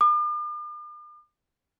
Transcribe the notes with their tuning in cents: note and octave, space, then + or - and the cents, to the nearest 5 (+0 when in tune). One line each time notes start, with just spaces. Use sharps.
D6 +45